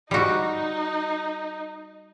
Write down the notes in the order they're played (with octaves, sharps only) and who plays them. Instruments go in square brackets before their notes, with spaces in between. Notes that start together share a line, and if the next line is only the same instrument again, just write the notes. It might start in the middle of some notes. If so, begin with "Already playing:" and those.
[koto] G3 F#4 [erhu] D#4